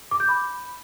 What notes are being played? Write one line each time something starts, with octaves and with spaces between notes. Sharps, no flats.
D6
G6
B5